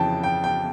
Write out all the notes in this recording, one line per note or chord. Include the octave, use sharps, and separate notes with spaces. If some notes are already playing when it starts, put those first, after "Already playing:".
Already playing: F2 C#3 E3 G5 A5
G5
G5